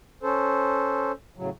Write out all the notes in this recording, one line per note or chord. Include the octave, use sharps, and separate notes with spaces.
C#4 A4 C5
A2 C#3 F#3